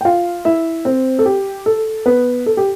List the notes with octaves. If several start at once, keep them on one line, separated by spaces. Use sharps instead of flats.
G5
F4 F5
E4 E5
C4 C5
A4
G4
A4
B3 B4
A4
G4